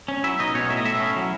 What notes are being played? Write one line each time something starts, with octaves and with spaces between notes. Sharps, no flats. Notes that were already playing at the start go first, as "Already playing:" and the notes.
C#4
F#3 E4 E5
B2 D#4 D#5
B2 C#4 C#5
A2 E5
D#5
A2 E4 E5
C#4
F#3